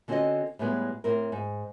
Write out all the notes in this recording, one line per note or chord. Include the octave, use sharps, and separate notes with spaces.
D3 C4 C#4 F#4 A4 D#5
A2 G3 G#3 B3
A2 C4 A#4
G#2